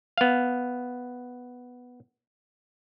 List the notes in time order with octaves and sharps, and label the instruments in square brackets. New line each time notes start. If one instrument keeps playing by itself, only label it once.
[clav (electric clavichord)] B3 F5